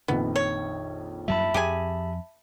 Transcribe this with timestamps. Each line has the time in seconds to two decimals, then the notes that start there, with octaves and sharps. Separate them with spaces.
0.08 A#1 F2 D#3 B3
0.36 C#5
1.28 F#2 F#3 G3 E5 A5 B5
1.54 F2 G4 G#4 G#5